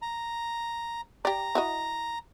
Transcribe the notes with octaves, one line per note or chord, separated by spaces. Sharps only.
A#5
G4 D5 A#5
E4 F#4 D#5